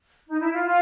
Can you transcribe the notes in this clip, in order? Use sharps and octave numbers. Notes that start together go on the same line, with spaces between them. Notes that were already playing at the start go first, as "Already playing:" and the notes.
D#4
E4
F4
F4